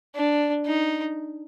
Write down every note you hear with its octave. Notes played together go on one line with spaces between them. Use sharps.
D4
D#4